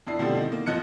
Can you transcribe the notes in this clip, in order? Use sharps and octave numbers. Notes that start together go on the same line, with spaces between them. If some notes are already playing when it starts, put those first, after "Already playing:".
F2 D4 E4 C7
B2 D3 F3 G3 A3 C4
D#3 D#5
A#3
A1 F#2 F3 D#5 F#6 C#7